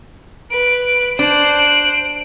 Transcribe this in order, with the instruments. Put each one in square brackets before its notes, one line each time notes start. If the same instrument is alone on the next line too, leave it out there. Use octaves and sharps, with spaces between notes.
[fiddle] B4 [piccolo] D7
[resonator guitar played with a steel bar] D4 [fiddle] C5 F#6 [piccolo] D7